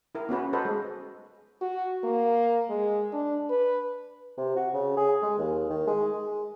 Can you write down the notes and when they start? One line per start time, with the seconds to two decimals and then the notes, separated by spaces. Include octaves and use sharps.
0.15 E4 A#4
0.29 B3 C#4 F#4 B4
0.53 F#4 A4 B4 C5 D#5
0.65 G#3
1.61 F#4
2.04 A#3
2.69 G#3
3.13 D4
3.50 B4
4.38 C3
4.57 F#4
4.74 C#3
4.97 G#4
5.23 G#3
5.39 D#2
5.70 D#3
5.88 G#3
6.13 G#3